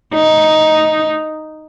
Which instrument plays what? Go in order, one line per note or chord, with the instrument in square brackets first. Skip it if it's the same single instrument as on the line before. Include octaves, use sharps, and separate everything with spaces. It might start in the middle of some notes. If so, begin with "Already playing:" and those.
[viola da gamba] D#4